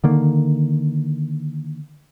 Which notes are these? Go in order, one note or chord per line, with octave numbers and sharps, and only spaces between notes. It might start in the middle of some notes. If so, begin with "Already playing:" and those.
D3 D#3 A#3